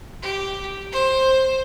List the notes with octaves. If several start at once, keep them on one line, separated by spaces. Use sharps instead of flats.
G4
C5